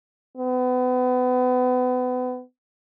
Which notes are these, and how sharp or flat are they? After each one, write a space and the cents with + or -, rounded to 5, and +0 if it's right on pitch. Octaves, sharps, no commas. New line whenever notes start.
B3 +30